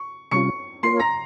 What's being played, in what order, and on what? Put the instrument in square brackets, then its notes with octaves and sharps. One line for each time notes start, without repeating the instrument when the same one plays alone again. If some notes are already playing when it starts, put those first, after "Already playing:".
Already playing: [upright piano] C#6
[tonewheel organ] C3 G3 C#4 F4 [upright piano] C#6 C#7
[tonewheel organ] A#3 F4 A#4 C#5 [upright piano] C6 C7
[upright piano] A#5 A#6